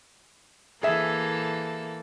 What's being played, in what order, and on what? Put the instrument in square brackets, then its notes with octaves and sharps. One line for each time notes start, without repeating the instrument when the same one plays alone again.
[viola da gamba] E3 A#3 A4 [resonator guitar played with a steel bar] G#4 E5